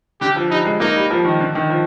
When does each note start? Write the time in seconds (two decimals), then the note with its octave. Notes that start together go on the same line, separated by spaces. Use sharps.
0.21 D3 G4
0.36 F3
0.51 G3 D#4
0.65 G#3
0.80 A#3 D#4
0.96 G3
1.10 F3
1.25 D#3
1.40 D3
1.55 D#3
1.70 F3